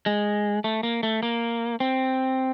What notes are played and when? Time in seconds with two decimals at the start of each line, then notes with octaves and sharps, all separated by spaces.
0.06 G#3
0.64 A3
0.83 A#3
1.03 A3
1.23 A#3
1.80 C4